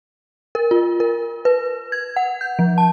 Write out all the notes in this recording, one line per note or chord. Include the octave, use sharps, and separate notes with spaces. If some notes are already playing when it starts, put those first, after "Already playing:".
A#4
F4
A#4
B4
G#6
F#5
G6
F3
A5